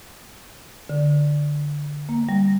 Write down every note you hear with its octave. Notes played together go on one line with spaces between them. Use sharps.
D3
A#3
G3